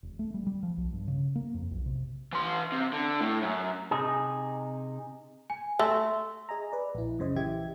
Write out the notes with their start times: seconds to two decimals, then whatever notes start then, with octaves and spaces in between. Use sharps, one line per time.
0.03 E1
0.19 A3
0.34 G3
0.46 G3
0.63 F3
0.77 B1
0.93 G2
1.08 C#3
1.35 A#3
1.54 F2
1.71 B1
1.86 C3
2.33 E3 C6
2.72 C3
2.93 D3
3.21 A2
3.42 F#2
3.91 C3 D#4 G#4
5.50 G#5
5.79 A3 E5 C6 E6
6.49 G#4 D#5 G#5 A#5
6.72 B4 D5
6.95 A#1 E4
7.19 F#2 C#3 C5 D#5
7.36 A#1 E3 G4 E5 G#6